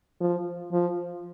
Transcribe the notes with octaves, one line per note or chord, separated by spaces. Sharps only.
F3
F3